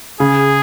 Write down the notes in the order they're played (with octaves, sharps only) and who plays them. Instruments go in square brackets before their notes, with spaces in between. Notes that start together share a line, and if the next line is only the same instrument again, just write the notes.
[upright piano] C#3 [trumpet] G#4